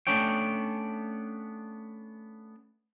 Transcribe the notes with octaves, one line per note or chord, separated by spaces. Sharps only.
A3 B3 C#4 D4 C#5 G5